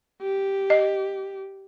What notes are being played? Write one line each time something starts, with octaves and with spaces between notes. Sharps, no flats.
G4
D#5